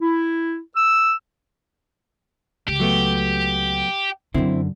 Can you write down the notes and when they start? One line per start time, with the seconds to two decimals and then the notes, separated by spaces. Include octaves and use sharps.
0.01 E4
0.76 E6
2.68 C#2 G4
2.80 F#3 A3 B3
4.34 F#2 D3 C4 E4